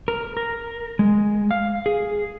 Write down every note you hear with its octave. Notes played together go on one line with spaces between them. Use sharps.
A#4
A#4
G#3
F5
G#4